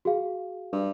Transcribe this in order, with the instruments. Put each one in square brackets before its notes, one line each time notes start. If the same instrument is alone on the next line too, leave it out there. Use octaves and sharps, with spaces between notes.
[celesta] F#4 G#4 F5
[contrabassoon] G2